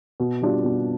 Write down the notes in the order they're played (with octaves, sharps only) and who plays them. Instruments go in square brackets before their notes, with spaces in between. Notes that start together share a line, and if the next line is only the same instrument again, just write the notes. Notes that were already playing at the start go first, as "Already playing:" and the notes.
[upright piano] B2
G3 D4 F4
B2